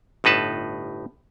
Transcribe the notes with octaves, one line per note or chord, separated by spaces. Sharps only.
G1 A2 D#4 B4 A5